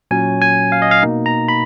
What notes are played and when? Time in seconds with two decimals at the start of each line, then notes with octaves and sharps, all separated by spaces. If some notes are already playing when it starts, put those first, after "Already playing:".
0.11 A#2 F#3 C#4 G#5
0.42 G#5
0.72 F5
0.82 D#5
0.91 F5
1.03 B2 A#3 D#4
1.26 A#5
1.48 B5